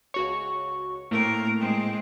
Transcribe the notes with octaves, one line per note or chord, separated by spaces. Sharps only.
C#2 F#4 C#5 C#6
A2 A3 A#3 C4 A#4
G#3 C4